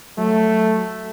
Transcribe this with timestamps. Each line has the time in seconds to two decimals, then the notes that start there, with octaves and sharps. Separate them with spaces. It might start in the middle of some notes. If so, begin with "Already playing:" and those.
0.18 F#3 A3